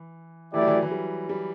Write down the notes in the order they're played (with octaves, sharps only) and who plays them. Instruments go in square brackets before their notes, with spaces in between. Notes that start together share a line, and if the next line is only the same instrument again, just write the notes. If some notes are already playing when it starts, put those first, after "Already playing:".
Already playing: [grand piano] E3
[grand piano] E3 [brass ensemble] A3 E4 G4 D5
[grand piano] F#3
E3
F#3
E3
G3
G3